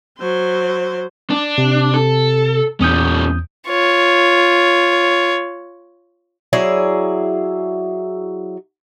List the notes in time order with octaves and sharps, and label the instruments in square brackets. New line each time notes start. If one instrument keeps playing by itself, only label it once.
[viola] F#3 C5
[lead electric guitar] D4
[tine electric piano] C3
[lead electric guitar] A4
[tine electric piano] E2 D#6 G6 [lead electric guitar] A#2 C#4
[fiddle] F4 C#5
[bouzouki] F#3 E4 G#4 D5